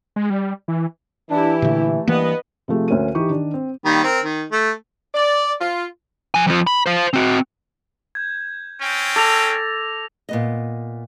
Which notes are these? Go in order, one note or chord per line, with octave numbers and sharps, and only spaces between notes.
G#3
G3
E3
E3 D4 E4 G4
A#2 D3 A3
G2 E3 A#3 B3 B4 D#5
C3 F3 A3 G#4
D2 C#4 A#4 D#7
E3 D#4 G4 C#6
D#3 D4
C4
D#3 G3 A#3
C4 A#4
D#3
A3
D5
F4
F3 G#5
F2 F3
B5
C5 F5
C4 F#4
G6 G#6
C4 C#4 G5
A4 D6 A#6 F7
A#2 B3 D#5